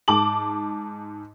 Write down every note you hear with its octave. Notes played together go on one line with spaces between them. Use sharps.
G#2 A5 D6 F#7